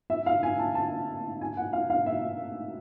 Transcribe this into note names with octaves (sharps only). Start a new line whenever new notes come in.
E5
F5
G#5
A5
A5
G#5
F#5
F5
F5
E5